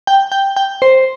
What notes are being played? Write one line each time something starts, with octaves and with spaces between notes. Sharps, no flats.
G5
G5
G5
C5